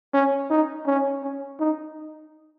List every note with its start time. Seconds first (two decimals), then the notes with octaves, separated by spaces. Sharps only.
0.14 C#4
0.50 D#4
0.87 C#4
1.23 C#4
1.60 D#4